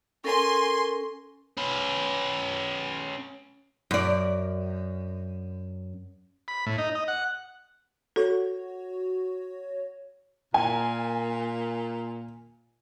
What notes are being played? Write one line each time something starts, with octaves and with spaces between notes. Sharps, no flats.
C#4 A4 A#4 G#5 C6
C#4 B4
F#2 D5
B5
A2
D#4
D#5
F#5
F#4 A4 C#5
A#2 G#5